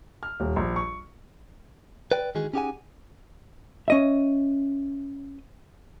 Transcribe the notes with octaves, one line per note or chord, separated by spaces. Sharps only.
F6
D#1
A#1
C#6
B4 D5 G5
D#3 E3 G#3 F#4 G#4
C#4 D#4 G4 G#4 F#5 G#5
C#4 D#5 E5